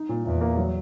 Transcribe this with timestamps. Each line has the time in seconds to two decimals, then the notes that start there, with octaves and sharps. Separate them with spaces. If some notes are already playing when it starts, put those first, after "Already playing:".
Already playing: D#4
0.09 A#2
0.25 E2 A#2
0.41 A#3
0.57 F#3